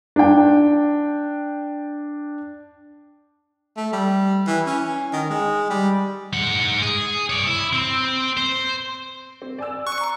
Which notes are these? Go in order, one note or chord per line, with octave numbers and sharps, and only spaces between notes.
D4 G5
A3
G3
E3
C#4
D#3
G#3
G3
G#2 F#5
G#4
C#5 D5
E4
C4
C5
C4
D5 G#5 E6
C#6 F#6
A#5